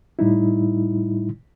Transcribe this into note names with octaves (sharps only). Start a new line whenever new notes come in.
A2 G3 D#4 E4